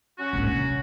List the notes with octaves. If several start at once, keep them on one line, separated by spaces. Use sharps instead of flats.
F#3 C#4 F#4
A#1 G#2
C3